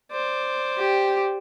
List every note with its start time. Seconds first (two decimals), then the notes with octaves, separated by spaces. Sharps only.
0.12 C5 D5
0.78 G4